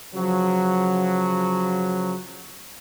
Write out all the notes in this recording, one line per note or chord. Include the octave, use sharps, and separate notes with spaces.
C#3 F3 F#3